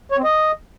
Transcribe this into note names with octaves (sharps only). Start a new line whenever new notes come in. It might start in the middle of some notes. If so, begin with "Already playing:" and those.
C#5
C4
D#5